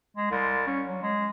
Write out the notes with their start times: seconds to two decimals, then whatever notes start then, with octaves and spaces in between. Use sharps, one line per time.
0.16 G#3
0.30 C2
0.67 C#4
0.87 F#3
1.02 G#3